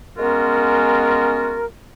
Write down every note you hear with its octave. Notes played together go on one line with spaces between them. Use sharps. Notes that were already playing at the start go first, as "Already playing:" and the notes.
G#3 B3 C#4 F4 F#4 A#4